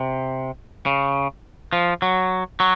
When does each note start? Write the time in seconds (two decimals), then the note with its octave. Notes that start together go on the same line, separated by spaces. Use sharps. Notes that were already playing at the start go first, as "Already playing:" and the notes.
Already playing: C3
0.86 C#3
1.73 F3
2.02 F#3
2.60 F#3